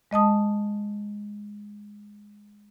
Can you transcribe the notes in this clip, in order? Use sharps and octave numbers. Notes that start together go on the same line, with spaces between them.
G#3 D#5 A5 D#6